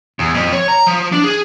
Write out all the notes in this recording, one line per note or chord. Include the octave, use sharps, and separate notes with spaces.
E2
F2
C#5
A#5
F3
D4
G#4